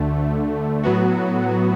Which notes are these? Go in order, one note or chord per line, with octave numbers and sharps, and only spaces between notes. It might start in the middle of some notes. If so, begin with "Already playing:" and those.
Already playing: D2 D3 A3
A2 F#3 B3 F#4